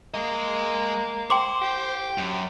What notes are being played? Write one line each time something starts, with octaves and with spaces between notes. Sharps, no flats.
G#3 A#3 D#5
C5 G5 C6 D6
G4
F#2